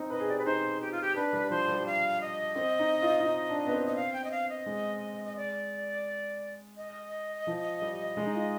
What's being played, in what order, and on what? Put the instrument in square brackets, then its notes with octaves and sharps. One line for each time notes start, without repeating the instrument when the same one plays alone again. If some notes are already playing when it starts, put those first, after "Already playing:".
Already playing: [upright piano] C4 D#4
[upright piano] B4 [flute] D#5
[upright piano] G#4
[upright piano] G4 [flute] D5
[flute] B4
[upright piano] D#4 [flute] C5
[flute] G4
F4
G4
[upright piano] D4 [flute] B4
[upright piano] G3
[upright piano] F3 [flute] C5
[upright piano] G3
[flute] F5
D#5
[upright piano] C4
D#4
F4
F4
D#4
D4
B3
C4
[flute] D#5
F5
G5
D#5
F5
D#5
[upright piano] G#3
[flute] D#5
D5
D#5
[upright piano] F3
G3
G#3
D#4
F4